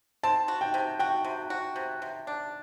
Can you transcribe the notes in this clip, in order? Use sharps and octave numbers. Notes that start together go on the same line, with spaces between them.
C4 A5
F#4
G5
C3
F#4 G5
C3
F#4
C3
C3
D4